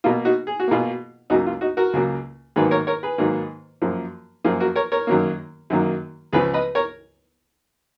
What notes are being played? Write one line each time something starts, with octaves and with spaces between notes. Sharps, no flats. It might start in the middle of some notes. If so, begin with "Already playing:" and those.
B2 A#3 F4
D#4 F#4
G#4
F#4
B2 A#3 F4 G#4
C#2 C#3 F#3 A#3 D#4 F#4
F4
D#4 F#4
F#4 A#4
C#2 C#3 F#3 A#3
G#2 D#3 F#3 A#3 G#4 B4
A#4 C#5
A#4 C#5
G#4 B4
G#2 D#3 F#3 A#3
F#2 F3 A#3
F#2 F3 A#3 F4 G#4
F#4 A#4
A#4 C#5
A#4 C#5
F#2 D#3 F#3 A#3
F#2 D#3 F#3 A#3
C#2 C#3 F3 G#4 B4
B4 D#5
A#4 C#5